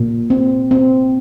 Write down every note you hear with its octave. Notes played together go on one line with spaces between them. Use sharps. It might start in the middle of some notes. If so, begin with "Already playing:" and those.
Already playing: A#2
C4
C4